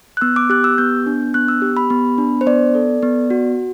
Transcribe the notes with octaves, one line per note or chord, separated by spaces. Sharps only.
F#6
B3 E6
D6
G4 F#6
E6
B3 G6
D4
B3 F#6
E6
G4
B5
B3
D4
C5
B3 D5
A4
B3
F#4